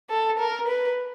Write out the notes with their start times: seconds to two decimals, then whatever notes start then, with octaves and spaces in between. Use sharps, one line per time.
0.10 A4
0.39 A#4
0.68 B4